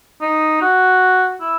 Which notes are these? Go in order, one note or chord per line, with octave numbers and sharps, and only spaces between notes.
D#4
F#4
E4